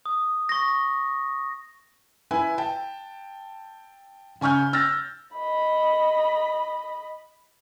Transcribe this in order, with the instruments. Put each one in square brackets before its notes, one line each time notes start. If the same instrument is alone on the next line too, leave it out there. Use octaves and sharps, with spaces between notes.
[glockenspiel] D#6
C#6 A#6
[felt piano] E4 B4 G#5
G5 A5
C#3 G#5 C#6 F6 G6
E6 F6 A6 A#6
[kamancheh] D#5 B5